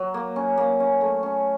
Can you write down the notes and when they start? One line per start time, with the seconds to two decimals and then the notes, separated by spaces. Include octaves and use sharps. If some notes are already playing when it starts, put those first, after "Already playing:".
Already playing: F#3
0.14 A#3
0.36 C#4
0.57 A#3
0.80 C#4
1.01 A3
1.23 C#4